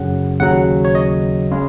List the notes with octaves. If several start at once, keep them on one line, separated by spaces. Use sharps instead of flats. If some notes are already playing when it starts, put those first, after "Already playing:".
Already playing: F#2 C#3 F#3 F#5
D#2 C#3 F#3 F#5
C#5
D#5
C#3 G#3